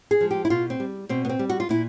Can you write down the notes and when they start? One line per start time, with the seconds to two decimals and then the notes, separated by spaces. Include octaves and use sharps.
0.11 G#4
0.21 F3 G#3
0.31 G4
0.45 E4
0.50 B2 F4
0.70 C4
0.80 G3
1.09 B2 C4
1.25 B3
1.29 C4
1.39 G3
1.50 F#4
1.60 F4
1.69 A#2 E4